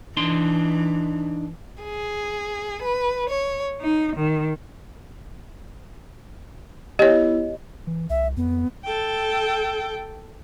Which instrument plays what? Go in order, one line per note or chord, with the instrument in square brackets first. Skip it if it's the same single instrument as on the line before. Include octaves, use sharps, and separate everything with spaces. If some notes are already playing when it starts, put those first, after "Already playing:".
[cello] E3 [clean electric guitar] D4 D#4 C6
[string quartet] G#4
B4
C#5
D#4
D#3
[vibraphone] B3 E4 [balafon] G4 C#5 [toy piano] D#5
[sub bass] E3
[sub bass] C2 [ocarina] E5
[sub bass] F2 [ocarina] B3
[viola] A4 G5